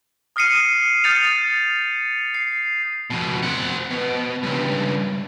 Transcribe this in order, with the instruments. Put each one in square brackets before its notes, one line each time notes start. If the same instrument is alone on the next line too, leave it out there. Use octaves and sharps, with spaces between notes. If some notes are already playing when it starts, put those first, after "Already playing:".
[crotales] D#6 F6 A#6 C7 C#7 D#7
D#6 F6 G6 A6 C#7 F7
C7
[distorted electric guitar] F2 B2
C4 F#5
B2
C#2 G2